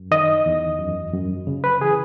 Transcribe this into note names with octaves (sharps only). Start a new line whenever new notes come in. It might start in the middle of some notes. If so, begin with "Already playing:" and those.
Already playing: F#2
D#3 D#5
E2
F#2
F#2
C#3
B4
E3 G#4